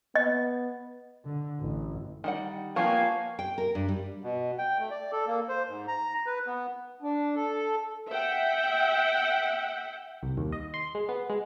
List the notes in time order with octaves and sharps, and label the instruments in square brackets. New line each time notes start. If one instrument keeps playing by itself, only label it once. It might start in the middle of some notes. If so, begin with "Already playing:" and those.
[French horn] B3 [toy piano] D#5
[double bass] D3
A1
[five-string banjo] D#3 G3 F#5
[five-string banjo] F3 B3 G4 [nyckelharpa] A#3 G#5 [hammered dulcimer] F4 C#5 [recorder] F5
[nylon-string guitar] G5
A#4
G2
G3
[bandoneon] B2
G5
A3
D5
A4
A#3
C5
G#2
A#5
B4
B3
[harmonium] D4
A4
[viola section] E5 F#5 G5
[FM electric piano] C2
D#2
D#5
C6
G#3
B3
G#3